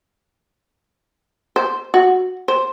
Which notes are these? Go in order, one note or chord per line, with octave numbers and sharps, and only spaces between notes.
C5
F#4
C5